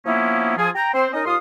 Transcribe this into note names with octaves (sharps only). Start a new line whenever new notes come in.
F3 A#3 B3 C#4 D#4 E4
F3 F4 G#4
G5 A#5
C4 C5
C#4 D#4 A#4 D#5
D#2 F4 F5 C6 D#6